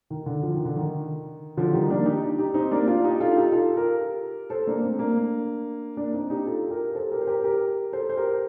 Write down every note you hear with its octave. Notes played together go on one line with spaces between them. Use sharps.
D#3
D3
F3
D#3
D3
D#3
D3 F3
D#3 G3
D#4
A#3 D4
D#4 G4
D#4 G4
C4 D#4
A#3 D4
D4 F4
D#4 G4
F4 A4
A4
D#4 G4
F4 A4
G4 A#4
A4 C5
A#3 D4
A3 C4
A#3 D4
A#3 D4
C4 D#4
D#4 G4
F4 A4
G4 A#4
A4 C5
G4 A#4
C5
G4 A#4
G4 A#4
A4 C5
C5
G4 A#4